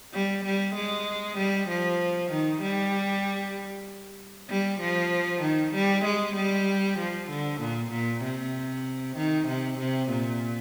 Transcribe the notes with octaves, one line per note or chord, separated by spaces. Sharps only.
G3
G3
G#3
G3
F3
D#3
G3
G3
F3
D#3
G3
G#3
G3
F3
D3
A#2
A#2
C3
D#3
C3
C3
A#2